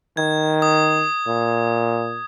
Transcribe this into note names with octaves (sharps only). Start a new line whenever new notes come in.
D#3 G#6
D#6
A#2